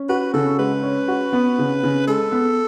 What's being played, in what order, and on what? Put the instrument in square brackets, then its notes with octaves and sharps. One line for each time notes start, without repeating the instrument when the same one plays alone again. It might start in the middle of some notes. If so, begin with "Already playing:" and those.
Already playing: [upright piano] C#4
[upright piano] F#4 [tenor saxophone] B4
[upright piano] C#3 [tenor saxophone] A4
[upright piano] G#3 [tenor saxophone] B4
[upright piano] C#4
F#4
B3
C#3
C#3
[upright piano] G#3 [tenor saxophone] A4
[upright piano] B3